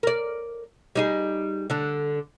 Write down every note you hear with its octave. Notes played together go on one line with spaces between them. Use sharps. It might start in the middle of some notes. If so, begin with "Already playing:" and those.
A#4 D5
G3 D#4 G#4
D3 D4